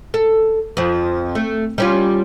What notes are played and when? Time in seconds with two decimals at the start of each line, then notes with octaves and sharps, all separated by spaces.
0.14 A4
0.77 F2 F3
1.35 A3
1.78 G3 C#4 F4